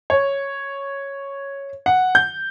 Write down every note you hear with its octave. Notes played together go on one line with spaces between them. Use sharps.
C#5
F#5
G6